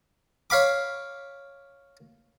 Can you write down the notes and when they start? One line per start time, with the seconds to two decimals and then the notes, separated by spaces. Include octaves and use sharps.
0.50 C#5 F5 B5 D6